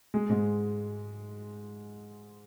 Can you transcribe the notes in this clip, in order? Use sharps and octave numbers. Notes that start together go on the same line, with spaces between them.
G#3
G#2 G#3